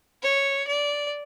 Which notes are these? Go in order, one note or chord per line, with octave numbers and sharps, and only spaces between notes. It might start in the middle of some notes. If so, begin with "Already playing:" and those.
C#5
D5